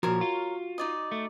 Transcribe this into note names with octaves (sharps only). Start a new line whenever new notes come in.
A#2 F3 F#4 A#4 C#5
F4
D#4 D5 D#5
A3